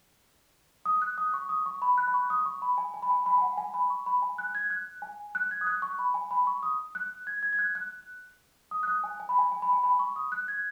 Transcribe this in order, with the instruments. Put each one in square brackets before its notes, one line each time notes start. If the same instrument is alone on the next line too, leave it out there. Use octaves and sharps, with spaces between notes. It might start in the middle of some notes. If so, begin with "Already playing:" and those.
[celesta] D#6
F#6
D#6
C#6
D#6
C#6
B5
F#6
B5
C#6
D#6
C#6
B5
G#5
G#5
B5
G#5
B5
G#5
F#5
G#5
B5
C#6
B5
G#5
F#6
G#6
F#6
G#5
F#6
G#6
D#6
F#6
C#6
B5
G#5
B5
C#6
D#6
F#6
G#6
G#6
G#6
F#6
F#6
D#6
F#6
D#6
G#5
G#5
B5
G#5
G#5
B5
G#5
B5
C#6
D#6
F#6
G#6